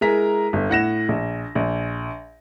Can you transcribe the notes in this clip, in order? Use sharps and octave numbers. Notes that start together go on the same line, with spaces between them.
G#3 E4 G#4 A#4 A#5 B6
G1
A2 F#5 A#6 E7
A#1
A#1